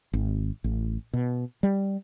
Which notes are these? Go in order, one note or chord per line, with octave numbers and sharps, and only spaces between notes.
G#1
A1
B2
G3